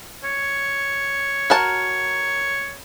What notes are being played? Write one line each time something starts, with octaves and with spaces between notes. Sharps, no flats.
C#5
F#4 A#4 A5